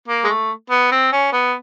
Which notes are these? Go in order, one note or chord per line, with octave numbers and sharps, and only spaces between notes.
A#3
G#3
A3
B3
C4
C#4
B3